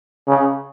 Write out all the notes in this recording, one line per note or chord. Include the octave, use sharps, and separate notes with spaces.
C#3